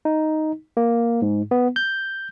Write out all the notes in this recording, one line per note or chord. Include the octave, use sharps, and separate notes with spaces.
D#4
A#3
G#2
B3
G6